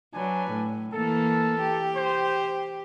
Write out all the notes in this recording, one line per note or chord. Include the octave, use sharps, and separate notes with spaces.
F#3 D4 B4 G#5
A2
E3 A#3 A4
G4
C5